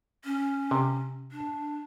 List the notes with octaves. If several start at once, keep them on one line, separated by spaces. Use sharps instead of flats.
C#4
C3
D4